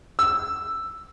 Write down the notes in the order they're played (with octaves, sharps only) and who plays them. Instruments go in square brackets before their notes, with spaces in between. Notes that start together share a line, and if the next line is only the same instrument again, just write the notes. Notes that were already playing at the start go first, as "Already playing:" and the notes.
[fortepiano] E6